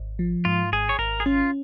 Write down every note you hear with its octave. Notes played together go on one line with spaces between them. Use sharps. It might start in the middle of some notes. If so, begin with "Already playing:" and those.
Already playing: G#1
F3
G#2 F4
G#1 G#4
C#5
G#1 A#4
G#4
C#4 F4